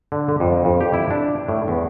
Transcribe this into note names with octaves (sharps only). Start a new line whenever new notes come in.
D3
D3
F2
F2
G4
E4
D4
A2
E2